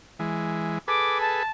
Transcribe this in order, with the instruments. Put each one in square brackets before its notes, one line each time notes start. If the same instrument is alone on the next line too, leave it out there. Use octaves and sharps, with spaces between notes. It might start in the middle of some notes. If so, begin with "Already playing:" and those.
[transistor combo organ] E3 G#3
[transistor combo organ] G#4 A4 B4 [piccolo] D6
[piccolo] A5